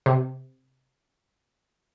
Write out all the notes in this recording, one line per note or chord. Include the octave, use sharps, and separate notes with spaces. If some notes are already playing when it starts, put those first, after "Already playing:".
C3